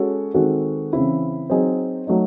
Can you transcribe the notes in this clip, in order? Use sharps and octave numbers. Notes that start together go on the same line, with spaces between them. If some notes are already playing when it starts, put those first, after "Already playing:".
Already playing: G#3 C#4 F#4 A4
D#3 G#3 C4 F#4 A4
C#3 E3 C4 E4
F#3 C4 D#4 G#4
F#3 A3 D#4